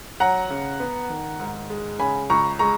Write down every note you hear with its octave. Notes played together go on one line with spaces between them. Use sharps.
F#3 F#5 A#5
C#3
B3
D#3
G#2
G#3
C#3 G#5 B5
C#2 A#5 C#6
G#3 A#5 C#6